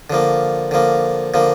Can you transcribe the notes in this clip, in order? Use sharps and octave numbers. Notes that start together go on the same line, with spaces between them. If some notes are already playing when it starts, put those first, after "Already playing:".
D3 F3 A#3
D3 F3 A#3
D3 F3 A#3